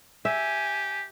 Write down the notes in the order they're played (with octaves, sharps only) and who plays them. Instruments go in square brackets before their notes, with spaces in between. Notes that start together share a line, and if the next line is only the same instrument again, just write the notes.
[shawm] G4 [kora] E5 [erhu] G#5